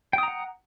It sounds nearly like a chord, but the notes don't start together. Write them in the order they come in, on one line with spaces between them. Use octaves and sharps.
G5 D#6 A#5 F#5